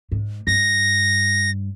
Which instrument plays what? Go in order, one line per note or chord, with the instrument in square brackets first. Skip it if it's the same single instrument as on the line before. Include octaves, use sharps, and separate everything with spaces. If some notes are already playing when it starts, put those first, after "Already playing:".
[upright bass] G#2
[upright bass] G2 [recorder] A#6